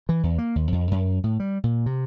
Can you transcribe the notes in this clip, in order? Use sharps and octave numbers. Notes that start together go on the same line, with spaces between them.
E3
E2
A#3
D#2
F2
F#2
A2
G3
A#2
C3